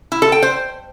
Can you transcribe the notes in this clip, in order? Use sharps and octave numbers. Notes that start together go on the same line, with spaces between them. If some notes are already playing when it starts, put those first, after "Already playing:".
E4
A4
G5
C5